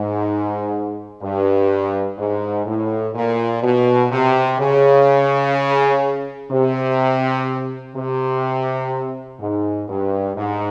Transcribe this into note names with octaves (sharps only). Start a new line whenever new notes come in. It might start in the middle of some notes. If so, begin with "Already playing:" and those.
Already playing: G#2
G2
G#2
A2
A#2
B2
C3
C#3
C3
C3
G#2
G2
G#2